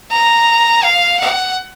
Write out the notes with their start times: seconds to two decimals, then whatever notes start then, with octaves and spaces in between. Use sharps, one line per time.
0.11 A#5
0.84 F5
1.20 F#5